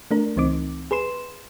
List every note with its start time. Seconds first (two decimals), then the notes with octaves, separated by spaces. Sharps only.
0.11 A3 D4 A#4
0.36 C#2 E3 C4 D#4 D6
0.91 G#4 B4 C6 E7